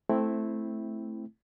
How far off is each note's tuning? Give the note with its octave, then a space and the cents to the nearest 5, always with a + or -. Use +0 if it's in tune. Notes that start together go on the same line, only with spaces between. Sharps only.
A3 -10 C4 +0 E4 +0